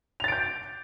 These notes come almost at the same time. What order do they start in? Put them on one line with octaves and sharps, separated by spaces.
F7 A6 D7 G6